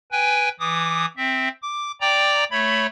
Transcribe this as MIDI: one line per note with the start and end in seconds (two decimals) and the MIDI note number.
0.12 0.49 71
0.12 0.49 79
0.12 0.49 80
0.59 1.05 52
0.59 1.05 86
0.59 1.05 87
1.17 1.48 60
1.17 1.48 76
1.62 1.91 86
2.01 2.44 74
2.01 2.44 79
2.01 2.44 82
2.01 2.44 86
2.51 2.87 57
2.51 2.87 73
2.51 2.87 83